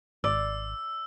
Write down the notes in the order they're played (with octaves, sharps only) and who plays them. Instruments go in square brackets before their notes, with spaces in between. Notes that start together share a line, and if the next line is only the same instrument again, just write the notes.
[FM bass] G#1 [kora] D5 [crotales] E6